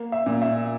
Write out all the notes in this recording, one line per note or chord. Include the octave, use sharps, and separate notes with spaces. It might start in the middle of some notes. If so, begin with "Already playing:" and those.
Already playing: A#3
E5
A#2
E5